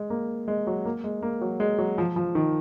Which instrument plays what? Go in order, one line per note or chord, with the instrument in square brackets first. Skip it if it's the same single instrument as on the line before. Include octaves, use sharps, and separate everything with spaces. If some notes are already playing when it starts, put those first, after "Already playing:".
Already playing: [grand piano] G#3
A#3
G#3
F#3
A#3
G#3
A#3
F#3
G#3
F#3
F3
F3
D#3